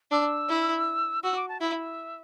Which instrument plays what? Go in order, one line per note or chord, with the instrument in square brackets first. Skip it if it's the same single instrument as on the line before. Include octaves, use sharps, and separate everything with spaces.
[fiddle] D4 [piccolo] E6
[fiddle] E4
[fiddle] F#4 [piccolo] E6
[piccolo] D6
A5
[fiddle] E4 [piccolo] E5